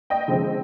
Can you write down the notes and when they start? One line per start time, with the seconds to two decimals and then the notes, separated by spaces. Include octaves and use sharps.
0.10 D#5 G5
0.28 D3 F3 G#3 C4